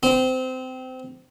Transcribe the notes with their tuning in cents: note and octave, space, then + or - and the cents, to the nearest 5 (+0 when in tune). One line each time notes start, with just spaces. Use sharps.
C4 -20